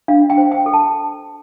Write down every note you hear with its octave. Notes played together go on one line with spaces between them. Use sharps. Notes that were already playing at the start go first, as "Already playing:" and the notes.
D4 F5
G5
C5
G5
A4
A5